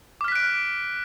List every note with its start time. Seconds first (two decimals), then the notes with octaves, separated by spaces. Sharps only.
0.21 D6
0.24 F6
0.28 B6
0.32 F#6
0.36 D7